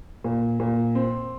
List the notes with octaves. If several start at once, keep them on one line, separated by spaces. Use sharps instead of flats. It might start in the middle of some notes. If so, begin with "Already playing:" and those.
A#2
A#2
C4